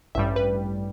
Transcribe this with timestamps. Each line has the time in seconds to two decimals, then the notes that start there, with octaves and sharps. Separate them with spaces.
0.15 A1 G2 G3 E5
0.36 B4